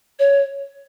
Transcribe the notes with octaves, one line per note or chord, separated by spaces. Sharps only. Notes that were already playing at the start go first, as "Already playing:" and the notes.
C#5